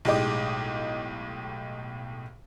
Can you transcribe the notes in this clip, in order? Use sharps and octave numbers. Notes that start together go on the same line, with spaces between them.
B1 A2 G#3 G4 D#5 D6